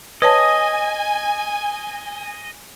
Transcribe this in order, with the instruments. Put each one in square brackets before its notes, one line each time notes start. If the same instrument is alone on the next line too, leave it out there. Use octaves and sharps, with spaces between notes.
[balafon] B4 C#5 A5 [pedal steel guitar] D#5 [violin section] G#5